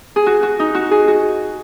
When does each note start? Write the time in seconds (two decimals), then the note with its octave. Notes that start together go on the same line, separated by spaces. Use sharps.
0.16 G#4
0.26 F#4
0.43 F#4
0.59 D#4
0.75 F#4
0.91 G#4
1.08 F#4